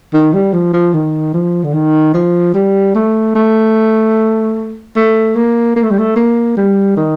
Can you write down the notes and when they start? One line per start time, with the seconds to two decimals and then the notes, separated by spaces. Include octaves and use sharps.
0.13 D#3
0.34 G3
0.53 F3
0.73 F3
0.94 D#3
1.34 F3
1.64 D3
1.74 D#3
2.14 F3
2.54 G3
2.95 A3
3.35 A3
4.96 A3
5.36 A#3
5.76 A#3
5.84 A3
5.91 G3
5.98 A3
6.16 A#3
6.57 G3
6.97 D#3